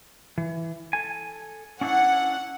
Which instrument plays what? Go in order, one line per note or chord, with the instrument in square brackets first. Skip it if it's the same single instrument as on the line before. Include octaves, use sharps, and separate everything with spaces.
[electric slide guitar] E3
A4 G#5
[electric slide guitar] C#4 D4 E4 [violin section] F#5